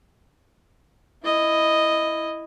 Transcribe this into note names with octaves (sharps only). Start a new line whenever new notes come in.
E4 D#5